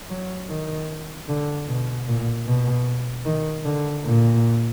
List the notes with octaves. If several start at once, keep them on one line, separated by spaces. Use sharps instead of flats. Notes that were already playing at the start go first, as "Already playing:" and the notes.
F#3
D#3
D3
B2
A#2
B2
D#3
D3
A#2